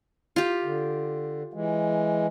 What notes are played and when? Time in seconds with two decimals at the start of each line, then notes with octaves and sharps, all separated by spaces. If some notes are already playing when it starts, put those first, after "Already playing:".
0.36 F4 G4
0.64 D3
1.54 E3 G#3